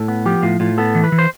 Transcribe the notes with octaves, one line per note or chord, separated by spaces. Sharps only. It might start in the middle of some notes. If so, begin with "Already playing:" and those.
Already playing: A2 A4
B3
F3 G4
A2 F4
A2 F4
B3 A4
E3
B4
E3
C5